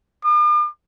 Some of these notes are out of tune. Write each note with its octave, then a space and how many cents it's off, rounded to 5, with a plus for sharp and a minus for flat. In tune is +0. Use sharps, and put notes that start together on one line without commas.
D6 +45